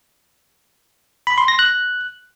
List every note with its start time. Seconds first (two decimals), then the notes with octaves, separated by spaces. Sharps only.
1.27 B5
1.38 C6
1.48 A#6
1.59 F#6